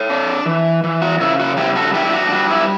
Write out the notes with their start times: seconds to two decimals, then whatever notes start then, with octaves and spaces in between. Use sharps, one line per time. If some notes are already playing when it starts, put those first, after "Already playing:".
Already playing: A4 C#5
0.09 D4
0.46 E3
0.84 E3
1.02 F#4
1.21 C#3 E4
1.39 F#4
1.57 G3 E4 G4
1.76 F#4 A4
1.94 D4 E4 G4
2.05 E4
2.13 F#4
2.32 G3 F#4
2.50 E4